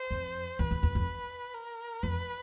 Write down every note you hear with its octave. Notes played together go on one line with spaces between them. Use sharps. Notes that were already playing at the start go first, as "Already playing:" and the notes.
Already playing: C5
F2
E2 B4
E2
E2
F2
A#4
F2 B4